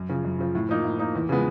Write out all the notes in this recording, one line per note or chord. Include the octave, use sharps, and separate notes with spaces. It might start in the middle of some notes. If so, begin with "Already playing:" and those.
Already playing: F#2
C#3 F3
F#2
C#3 F3
A2
F3 A#3 D#4
A2
F3 A#3 D#4
E2
C#3 F3 G#3 B3